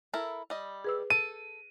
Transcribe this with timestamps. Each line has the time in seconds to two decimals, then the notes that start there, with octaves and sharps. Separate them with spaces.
0.14 E4 A4 A#4
0.50 G3 D#5
0.84 G#4 B4 E6
1.10 A4 D#7